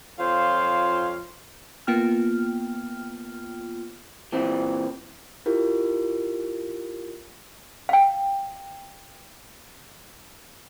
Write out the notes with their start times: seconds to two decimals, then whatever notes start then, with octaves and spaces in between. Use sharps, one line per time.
0.18 F2 F4 C5 C#5 F5
1.87 A#3 B3 F4 G5 F6
4.32 A#2 E3 C4
5.46 E4 F4 G4 A#4
7.89 F5 G5